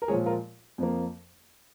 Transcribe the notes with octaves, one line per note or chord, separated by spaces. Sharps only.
A#4
A#2 F3 G#3 G#4 C#5
F4 A#4
F2 F3 A#3